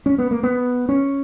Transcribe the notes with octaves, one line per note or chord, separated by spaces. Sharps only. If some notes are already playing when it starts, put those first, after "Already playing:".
C#4
B3
A#3
B3
C#4